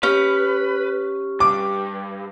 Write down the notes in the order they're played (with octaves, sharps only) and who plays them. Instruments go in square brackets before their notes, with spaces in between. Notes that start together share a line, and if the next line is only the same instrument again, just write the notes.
[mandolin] C#4 [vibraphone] G4 [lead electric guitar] B4
[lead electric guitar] G2 [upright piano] D6